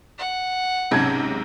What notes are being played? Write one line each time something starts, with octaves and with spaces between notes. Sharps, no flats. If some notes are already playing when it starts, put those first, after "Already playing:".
F#5
B1 G#2 C3 C#4 A5 G#6